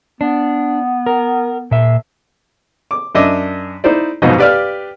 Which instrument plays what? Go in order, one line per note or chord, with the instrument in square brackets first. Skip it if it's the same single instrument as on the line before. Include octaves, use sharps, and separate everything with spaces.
[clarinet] B3 [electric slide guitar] D4
[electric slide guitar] A#4
A#2 E5
[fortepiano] D6
F#2 D4 D#5 E5 D6
D#4 E4 C5 D5
F2 G#2 B2 F#3 D#4 D#5
G4 B4 D5 F5 F6